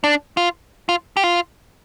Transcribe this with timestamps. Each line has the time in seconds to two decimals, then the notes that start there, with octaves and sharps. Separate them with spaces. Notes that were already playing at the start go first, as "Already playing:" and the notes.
0.04 D4
0.37 F4
0.89 F4
1.17 G4
1.24 F4